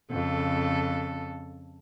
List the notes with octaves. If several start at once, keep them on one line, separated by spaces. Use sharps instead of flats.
F2 C#3 A4